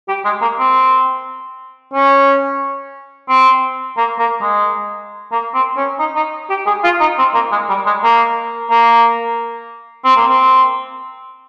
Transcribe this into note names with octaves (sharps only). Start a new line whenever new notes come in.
G4
G#3
A#3
C4
C#4
C4
A#3
A#3
G#3
A#3
C4
C#4
D#4
D#4
G4
G#4
F4
D#4
C4
A#3
G#3
G3
G#3
A#3
A#3
C4
A#3
C4